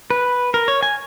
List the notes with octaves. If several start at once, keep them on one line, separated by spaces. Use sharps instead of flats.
B4
A#4
C#5
G#5